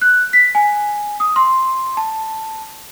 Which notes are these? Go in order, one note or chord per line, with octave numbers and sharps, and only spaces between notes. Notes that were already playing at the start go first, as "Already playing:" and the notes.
F#6
B6
G#5
D#6
C6
A5